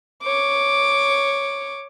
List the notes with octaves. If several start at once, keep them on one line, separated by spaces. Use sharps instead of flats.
C#5 D6